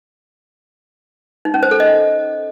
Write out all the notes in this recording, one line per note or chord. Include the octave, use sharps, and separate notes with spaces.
D#4
C#4
C5
A4
D#5